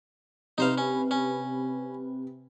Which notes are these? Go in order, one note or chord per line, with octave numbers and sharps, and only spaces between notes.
C3 D#4 B4 C5 F5
C#4
C#4